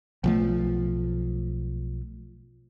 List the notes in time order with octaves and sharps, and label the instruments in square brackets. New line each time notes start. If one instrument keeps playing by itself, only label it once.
[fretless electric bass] B1 F3 A3